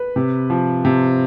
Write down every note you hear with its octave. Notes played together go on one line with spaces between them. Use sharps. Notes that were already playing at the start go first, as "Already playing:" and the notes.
Already playing: B4
C3
F3
C3